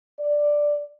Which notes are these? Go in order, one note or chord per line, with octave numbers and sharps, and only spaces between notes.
D5